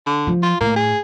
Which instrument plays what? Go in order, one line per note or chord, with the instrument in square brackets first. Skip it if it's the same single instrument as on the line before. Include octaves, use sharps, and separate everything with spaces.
[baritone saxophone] D3
[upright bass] F3
[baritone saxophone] F4
[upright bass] A2 [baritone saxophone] A#3
[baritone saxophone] G#4